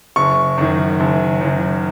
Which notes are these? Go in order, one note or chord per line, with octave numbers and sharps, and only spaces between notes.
F#1 C#6
F#2 D#3
F#1
F#2 D#3